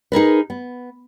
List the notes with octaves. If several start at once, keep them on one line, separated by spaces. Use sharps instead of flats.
D#4 G#4 A#4 B4
B3